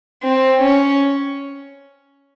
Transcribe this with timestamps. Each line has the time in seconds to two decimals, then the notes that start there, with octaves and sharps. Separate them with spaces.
0.23 C4
0.61 C#4